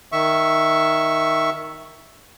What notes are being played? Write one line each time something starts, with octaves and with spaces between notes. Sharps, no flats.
D#3 E5 C#6